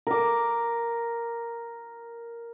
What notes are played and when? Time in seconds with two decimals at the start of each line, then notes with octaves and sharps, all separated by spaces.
0.07 A#4 D6